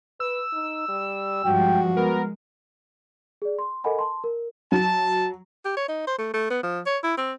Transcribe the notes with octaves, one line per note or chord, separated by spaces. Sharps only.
B4 E6
D#4
G3
G2 F3 G#3 F#4 G5
G#3 B3 A#4
G#4 D5
C6
A4 A#4 D#5 F#5 G#5 B5
A5 C6
A#4
F#3 A5
G4
C#5
D#4
C5
A3
A3
B3
F3
C#5
E4
C4